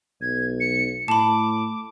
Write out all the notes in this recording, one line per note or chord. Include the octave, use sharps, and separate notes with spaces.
B1 G#6
C#7
A2 A5 B5 D6